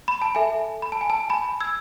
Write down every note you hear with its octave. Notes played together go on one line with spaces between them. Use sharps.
B5
A5
A4 E5 G#5
B5
A5
G#5
A5
G#5 B5
E6 G#6